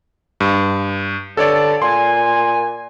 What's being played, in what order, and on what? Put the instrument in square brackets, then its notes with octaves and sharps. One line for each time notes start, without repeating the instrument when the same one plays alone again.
[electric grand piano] G2
[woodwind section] G2 D3 A5 [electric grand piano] A4 C#5 D5
[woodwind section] A#2 G#5 [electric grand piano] C6